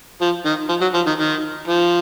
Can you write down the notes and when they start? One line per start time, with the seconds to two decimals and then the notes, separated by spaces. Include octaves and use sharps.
0.21 F3
0.45 D#3
0.69 F3
0.81 F#3
0.94 F3
1.07 D#3
1.19 D#3
1.68 F3